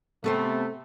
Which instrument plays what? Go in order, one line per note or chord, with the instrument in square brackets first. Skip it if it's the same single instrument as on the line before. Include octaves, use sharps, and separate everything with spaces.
[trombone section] C3 A3 [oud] B3 A4 C5